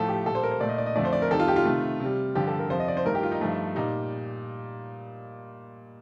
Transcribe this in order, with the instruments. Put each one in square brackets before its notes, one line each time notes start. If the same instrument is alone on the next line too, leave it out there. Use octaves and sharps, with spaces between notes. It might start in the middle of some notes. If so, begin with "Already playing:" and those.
Already playing: [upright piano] A2 F3 A3 A4
G4
A#2 G3 A4
C5
A#4
C5
A#2 A3 D5
D#5
D5
D#5
F2 D3 F3 A3 D5
C5
D5
A#4
F2 D#3 G3 A4
F4
G4
F4
C3 D#3 A3
C3
G3
G2 D3 F3 G4
A4
A#4
F2 C3 F3 C5
D#5
D5
C5
G2 D#3 A3 A#4
G4
F4
D#4
G2 F3 A3
A#2 G3 D#4